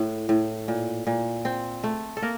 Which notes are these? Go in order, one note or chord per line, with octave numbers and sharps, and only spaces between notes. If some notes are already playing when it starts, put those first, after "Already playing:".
Already playing: A2
A2
A#2
A#2
C4
A3
A4
A#3 A#4